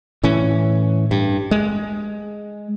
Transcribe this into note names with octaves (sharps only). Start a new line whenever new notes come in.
A2 E3 C#4
G2
G#3